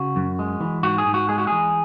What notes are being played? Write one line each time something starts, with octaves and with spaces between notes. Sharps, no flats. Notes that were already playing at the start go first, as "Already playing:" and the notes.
Already playing: C#3 F#4
F#2
G#3
E3
G#2 F#4
G#4
G#2
F#4
G#3 G#4
F#4
E3 G#4